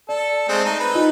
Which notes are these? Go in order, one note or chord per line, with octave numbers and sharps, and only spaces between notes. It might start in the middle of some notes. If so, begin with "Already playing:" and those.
A4 D5
G#3 A3 C4
D#4
B4
D#4 F4 D#5